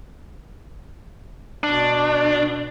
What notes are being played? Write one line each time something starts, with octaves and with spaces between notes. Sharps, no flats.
B2 D4